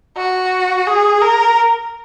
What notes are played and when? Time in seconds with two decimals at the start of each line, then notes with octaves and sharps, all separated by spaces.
0.17 F#4
0.87 G#4
1.22 A#4